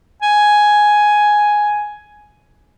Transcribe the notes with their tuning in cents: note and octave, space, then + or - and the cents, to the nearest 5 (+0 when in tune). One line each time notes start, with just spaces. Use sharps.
G#5 +5